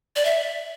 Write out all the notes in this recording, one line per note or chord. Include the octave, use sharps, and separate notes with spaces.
D5
E5